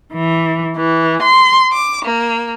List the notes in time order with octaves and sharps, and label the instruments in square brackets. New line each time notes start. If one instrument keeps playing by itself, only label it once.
[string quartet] E3
E3
C6
D6
A#3